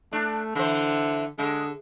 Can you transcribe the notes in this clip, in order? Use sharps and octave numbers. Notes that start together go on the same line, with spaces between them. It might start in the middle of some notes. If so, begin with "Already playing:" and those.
A3 D4
D3 E3 C5
D3 G#3